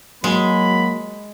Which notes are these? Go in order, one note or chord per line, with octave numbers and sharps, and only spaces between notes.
F#3 G#3 A#3 B5